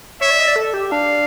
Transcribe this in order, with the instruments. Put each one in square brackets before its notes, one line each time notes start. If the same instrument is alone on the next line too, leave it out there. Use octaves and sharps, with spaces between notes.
[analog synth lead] C#5 [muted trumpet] E5
[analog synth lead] D5
D#5
D5
A4
G4
[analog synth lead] D4 [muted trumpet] F5